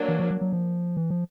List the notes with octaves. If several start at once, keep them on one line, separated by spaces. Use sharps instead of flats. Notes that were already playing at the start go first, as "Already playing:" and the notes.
Already playing: F#3 A#3 D4
E3
F3
F#3
F#3
F3
E3
F3